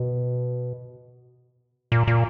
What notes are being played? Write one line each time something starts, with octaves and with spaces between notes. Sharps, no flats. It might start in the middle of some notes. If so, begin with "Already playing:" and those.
Already playing: B2
A#2
A#2